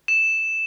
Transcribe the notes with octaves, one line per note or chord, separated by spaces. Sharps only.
E7